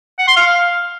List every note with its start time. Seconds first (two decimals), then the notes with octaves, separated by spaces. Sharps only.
0.19 F#5
0.28 C6
0.37 F5